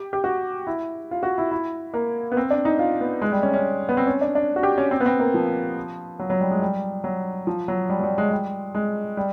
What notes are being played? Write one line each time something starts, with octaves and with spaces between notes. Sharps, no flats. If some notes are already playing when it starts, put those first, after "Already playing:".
Already playing: G4
G4
F#4
E4
F4
F#4
E4
E4
A#3
B3
C4
D4
D#4
F4
B3
G#3
G3
C#4
C#4
B3
C4
C#4
D4
D4
F#4
G4
C#4
C4
B3
C4
A#3
F3
F#3
F#3
G3
G#3
G3
F#3
F3
F#3
G3
F#3
G3
G#3
G3
G#3
G3